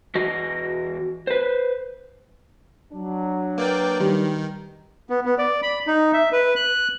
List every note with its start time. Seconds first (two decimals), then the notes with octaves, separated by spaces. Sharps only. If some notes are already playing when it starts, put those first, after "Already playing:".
0.15 E2 F#4 D#5
1.27 B4 C5
2.93 F#3 D4
3.58 A#3 B4 D5 G5
4.00 D#3 G3
5.10 B3
5.25 B3
5.38 D5
5.63 B5
5.87 D#4
6.13 E5
6.32 B4
6.56 F#6